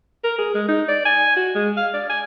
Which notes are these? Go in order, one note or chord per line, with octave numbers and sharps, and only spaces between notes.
A#4
G#4
G#3
D#4
D5
G#5
F#4
G#3
F5
D5
G#5